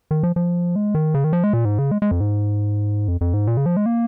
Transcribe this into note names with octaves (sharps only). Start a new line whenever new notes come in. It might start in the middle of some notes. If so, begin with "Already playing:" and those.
D#3
F3
F3
G#3
D#3
C#3
D#3
F3
G#3
A#2
G#2
C#3
G#3
G#3
F2
G#2
F2
F2
G#2
A#2
C#3
F3
G#3
A#3